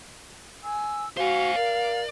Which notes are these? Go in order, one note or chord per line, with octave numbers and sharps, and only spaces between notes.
G#5 E6
F#4 C5 F5 G#5
A#4 D5